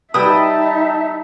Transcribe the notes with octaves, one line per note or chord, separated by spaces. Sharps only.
G3 D#4 E4 B4 E5 G5 A5 D#6